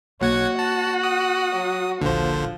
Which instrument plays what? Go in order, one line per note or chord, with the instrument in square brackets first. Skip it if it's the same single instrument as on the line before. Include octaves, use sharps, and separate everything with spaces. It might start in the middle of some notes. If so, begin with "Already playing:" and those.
[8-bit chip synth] B1 F#5 G#6 [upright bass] A#3 [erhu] F#4 [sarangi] C#5
[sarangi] F#5 [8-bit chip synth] A5
[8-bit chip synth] D#6
[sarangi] F#3
[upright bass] D#1 A#1 [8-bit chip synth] D3 C5 [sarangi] F3